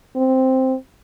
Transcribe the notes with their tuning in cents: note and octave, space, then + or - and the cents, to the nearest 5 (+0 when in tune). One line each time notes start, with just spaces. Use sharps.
C4 +0